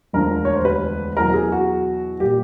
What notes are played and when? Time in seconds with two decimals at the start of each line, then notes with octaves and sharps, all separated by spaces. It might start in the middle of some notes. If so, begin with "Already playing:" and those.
0.13 E1 D2 D3 F3 A#4
0.45 C#5
0.55 C5
0.65 B4
1.17 E2 B2 F#3 A#4
1.34 G#4
1.52 F#4
2.20 A#2 G3 G4